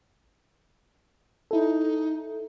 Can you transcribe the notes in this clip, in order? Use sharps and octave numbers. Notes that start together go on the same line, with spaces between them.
D#4 E4 A4